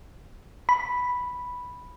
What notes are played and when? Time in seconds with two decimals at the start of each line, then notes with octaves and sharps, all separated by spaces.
0.69 B5